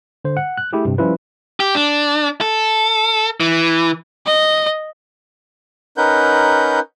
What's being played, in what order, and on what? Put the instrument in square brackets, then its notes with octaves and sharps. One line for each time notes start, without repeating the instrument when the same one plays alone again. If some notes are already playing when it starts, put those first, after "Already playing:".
[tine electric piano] D3 C5
F#5
F#6
A3 E4 G4 G#4
G2 C3
F3 G3 C#4 E4 F4 B4
[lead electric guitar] G4
D4
A4
E3
[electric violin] D#5
[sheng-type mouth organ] C#4 D#4 A#4 B4 F#5 G6